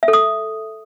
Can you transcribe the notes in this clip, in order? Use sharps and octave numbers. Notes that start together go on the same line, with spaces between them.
E5
A4
D#6